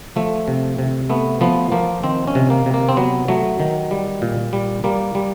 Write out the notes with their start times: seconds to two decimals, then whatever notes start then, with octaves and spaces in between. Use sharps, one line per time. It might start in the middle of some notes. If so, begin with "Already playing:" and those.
0.16 F3 A3
0.48 C3
0.79 C3
1.10 A3 B3
1.41 F3 B3
1.72 F3 A#3
2.04 D#3 C4
2.27 C#4
2.35 C3
2.50 A#3
2.66 C3
2.74 A#3
2.89 C4
2.97 F#3 B3
3.28 F#3 A3
3.60 D#3
3.91 G3
4.22 A#2
4.53 G3
4.84 G3 A#3
5.15 G3